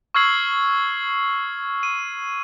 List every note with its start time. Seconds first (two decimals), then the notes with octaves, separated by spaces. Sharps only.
0.14 C#6 E6 F6 G#6 C7 F#7
1.83 D#7